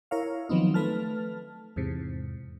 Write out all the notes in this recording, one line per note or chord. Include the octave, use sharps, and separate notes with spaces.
E4 A#4 C#5 F5
D#3 F3 F#3 B3 C4 D#4
A3 B4 A5 F6
E2 G#2 C3